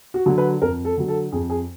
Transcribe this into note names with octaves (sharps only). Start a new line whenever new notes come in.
F#4
D3 F#3
B4
F2 A#4
A4
D3 F#3
A4
F2 G#4
G#4